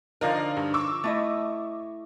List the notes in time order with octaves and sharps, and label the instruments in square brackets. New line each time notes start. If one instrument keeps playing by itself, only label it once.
[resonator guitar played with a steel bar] D3 F3 D#4 [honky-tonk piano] A#4 D5 F5
[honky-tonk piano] G2
C#6 D6 E6
[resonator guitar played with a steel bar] A3 E4 D#5